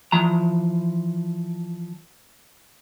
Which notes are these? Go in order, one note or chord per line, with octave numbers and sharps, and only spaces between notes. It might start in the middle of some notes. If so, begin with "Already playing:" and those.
E3 F3 A#5